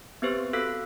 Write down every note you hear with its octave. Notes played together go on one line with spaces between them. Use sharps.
B3 C4 G4 B4 C5
F#4 A4 F5 E6 F#6 B6